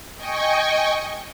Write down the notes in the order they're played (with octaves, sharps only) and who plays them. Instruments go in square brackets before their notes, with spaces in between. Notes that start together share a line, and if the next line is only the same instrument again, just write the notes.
[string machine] D#5 G5 G#5 C#6